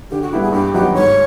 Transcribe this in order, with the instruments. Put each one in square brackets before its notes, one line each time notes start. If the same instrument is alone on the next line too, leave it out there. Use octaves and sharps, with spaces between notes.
[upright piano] D3 [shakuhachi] G4
[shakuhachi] F#4
[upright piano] G3 B3 E4 [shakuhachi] G4
[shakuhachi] G#4
[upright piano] G2 [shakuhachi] G4
[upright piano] D#3 F#3 B3 D#4 [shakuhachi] G4
[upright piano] G#2 [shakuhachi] C#5